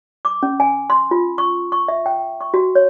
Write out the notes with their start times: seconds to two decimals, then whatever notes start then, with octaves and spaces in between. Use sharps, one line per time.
0.25 D6
0.43 C#4
0.60 G#5
0.90 C6
1.11 F4
1.38 C#6
1.72 C#6
1.88 E5
2.06 G5
2.41 C#6
2.54 F#4
2.75 C#5